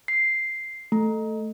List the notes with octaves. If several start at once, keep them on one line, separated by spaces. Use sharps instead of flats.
C7
A3